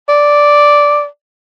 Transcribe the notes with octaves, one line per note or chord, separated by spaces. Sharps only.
D5